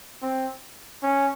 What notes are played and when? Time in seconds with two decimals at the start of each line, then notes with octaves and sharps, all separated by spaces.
0.23 C4
1.03 C#4